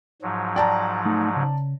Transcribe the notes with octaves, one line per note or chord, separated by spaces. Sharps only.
G#2 F3 F#3
D5 G5 A5 A#5
A3 D#4
C#3